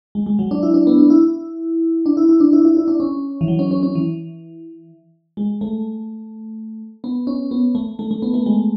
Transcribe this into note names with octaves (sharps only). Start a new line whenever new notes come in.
G#3
G#3
F#3
D4
E4
D4
B3
D4
E4
D4
E4
E4
D4
E4
E4
E4
D4
C#4
E3
F#3
C#4
C#4
C#4
E3
G#3
A3
B3
C#4
B3
A3
A3
A3
B3
A3
G#3